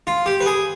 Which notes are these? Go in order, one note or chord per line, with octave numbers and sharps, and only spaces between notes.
F4
G4
B4
G#4